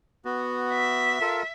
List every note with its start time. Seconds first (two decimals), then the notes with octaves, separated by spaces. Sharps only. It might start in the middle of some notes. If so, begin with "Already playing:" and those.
0.25 B3 F#4
0.72 E5
1.21 F4 A4 A#4